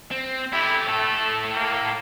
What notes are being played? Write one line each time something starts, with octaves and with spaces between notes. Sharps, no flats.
C4
A3 E4 G4
A2 A3 A4
A#3